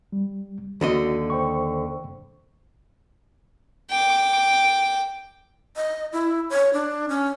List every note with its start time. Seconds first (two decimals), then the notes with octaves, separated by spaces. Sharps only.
0.12 G3
0.81 D#2 D3 F#4 D#5
1.30 C5 G5 C#6
3.90 G5 D6
5.76 D#5
6.13 E4
6.50 C#5
6.73 D4
7.09 C#4